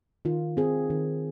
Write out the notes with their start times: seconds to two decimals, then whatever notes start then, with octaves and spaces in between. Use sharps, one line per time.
0.25 D#3 F4
0.57 C4 G#4
0.90 D#3